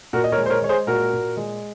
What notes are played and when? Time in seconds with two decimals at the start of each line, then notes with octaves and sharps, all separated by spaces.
0.13 A#2 F#4 A#4
0.24 D#5
0.32 A#4 C#5
0.38 G#3
0.46 C5
0.50 A#4 C#5
0.62 G#3 C#5
0.69 G#4 C5
0.87 A#2 F#4 A#4
1.13 A#2
1.37 G#3